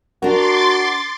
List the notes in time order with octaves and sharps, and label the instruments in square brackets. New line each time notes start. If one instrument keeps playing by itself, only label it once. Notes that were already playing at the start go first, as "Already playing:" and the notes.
[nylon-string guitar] D4 A#4 [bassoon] F#4 [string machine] C6 D6 A6